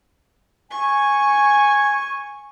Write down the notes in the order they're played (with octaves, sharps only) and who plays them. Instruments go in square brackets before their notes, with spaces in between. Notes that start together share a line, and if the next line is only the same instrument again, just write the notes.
[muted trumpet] G#5 [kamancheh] C#6